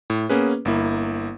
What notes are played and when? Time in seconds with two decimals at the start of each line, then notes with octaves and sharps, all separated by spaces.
0.10 A2
0.30 A#3 B3 C#4 G#4 B4
0.65 G1 A#3 E4